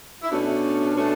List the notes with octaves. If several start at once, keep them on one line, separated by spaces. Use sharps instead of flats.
E4
B2 A3 C#4 D4
B2 A3 C#4